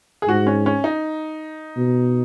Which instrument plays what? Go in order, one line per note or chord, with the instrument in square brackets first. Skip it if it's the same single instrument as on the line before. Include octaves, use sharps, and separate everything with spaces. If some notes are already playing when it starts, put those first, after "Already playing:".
[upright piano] G#4
[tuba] G#2 [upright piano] F#4
[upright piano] C#4
C#4
D#4
[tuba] B2